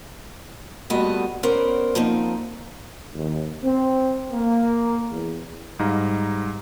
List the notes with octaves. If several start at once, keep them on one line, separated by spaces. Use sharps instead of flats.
A#2 G3 A3 B3 F#4 D#5
B3 C#4 A#4 C5 D5
F3 A#3 C4 D#4
D#2
C4
A#3
E2
G#2 G3 D#4 F5 A#5